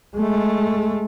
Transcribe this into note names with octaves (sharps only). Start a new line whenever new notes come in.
G#3 A3